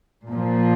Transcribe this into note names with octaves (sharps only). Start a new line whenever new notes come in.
A#2 F3